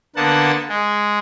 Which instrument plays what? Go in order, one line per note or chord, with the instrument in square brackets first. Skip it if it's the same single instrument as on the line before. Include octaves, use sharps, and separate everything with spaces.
[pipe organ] D3 A#3 B3 F#5 A5
G#3